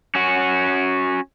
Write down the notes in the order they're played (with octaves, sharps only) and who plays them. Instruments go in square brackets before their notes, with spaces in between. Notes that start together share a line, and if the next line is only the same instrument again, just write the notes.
[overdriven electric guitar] C#4 F#4